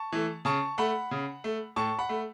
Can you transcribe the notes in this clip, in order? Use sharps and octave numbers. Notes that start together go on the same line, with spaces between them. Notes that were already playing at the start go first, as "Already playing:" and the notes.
Already playing: A5 C#6
E3 A3
C#3 A5 C#6
A3 F#5 B5
C#3
A3
A2 A5 C#6
F#5 B5
A3